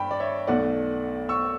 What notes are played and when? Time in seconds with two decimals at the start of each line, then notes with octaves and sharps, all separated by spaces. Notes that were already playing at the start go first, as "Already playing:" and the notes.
Already playing: G2 G5 B5
0.11 D5
0.20 C#5 E5
0.47 B1 B2 A3 D5 F#5
1.29 C#6 E6